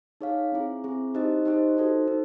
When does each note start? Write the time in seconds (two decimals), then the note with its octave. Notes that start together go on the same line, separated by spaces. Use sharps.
0.21 D#4 G#4 C#5 F5
0.52 C4 E4 G#4
0.84 C4 E4 G#4
1.15 D#4 G4 C5 D#5
1.45 D#4 G4 C5 D#5
1.77 D#4 F#4 A4 C5
2.08 D#4